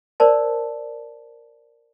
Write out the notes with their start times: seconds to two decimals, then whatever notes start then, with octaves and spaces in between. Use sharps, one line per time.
0.20 A#4 C5 D5 A5